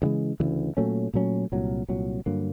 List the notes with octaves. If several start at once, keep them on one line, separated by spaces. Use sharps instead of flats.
D2 C#3 E3 G#3
D2 C#3 E3 G#3
A#2 F#3 A3 C#4
A#2 F#3 A3 C#4
C2 A#2 F#3
C2 A#2 F#3
G2 D3 F#3 A#3